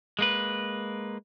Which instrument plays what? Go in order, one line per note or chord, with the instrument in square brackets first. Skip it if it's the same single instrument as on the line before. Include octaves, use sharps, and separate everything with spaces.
[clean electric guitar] G#3 A#3 B4